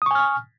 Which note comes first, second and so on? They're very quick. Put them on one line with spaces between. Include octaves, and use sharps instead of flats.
D#6 C#6 G#5 F6